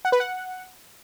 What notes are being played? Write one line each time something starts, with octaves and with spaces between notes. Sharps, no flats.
F#5
B4
F#5